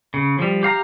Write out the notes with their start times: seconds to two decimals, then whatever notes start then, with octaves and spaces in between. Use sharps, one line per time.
0.14 C#3
0.39 F3 G3
0.63 G4 F5 A#5